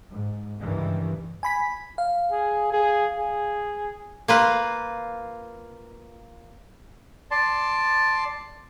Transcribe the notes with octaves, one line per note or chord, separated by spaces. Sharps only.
G#2
C#2 G2 D#3 E3 G3
G#5 B5 B6
F5
G#4
G#4
G#4
A#3 F4 B4
D5 A5 C6